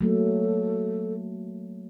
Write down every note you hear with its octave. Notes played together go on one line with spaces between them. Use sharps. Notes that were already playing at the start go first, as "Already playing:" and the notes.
F#3 A3 A#3 A4